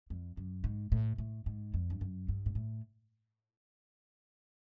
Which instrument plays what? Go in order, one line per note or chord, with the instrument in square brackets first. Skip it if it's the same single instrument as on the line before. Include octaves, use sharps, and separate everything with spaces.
[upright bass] F2
F#2
G#2
A2
A2
G#2
F2
G2
F#2
G2
G#2
A2